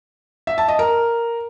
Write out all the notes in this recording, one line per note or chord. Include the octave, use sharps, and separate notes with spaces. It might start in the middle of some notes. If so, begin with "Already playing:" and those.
E5
A5
D#5
A#4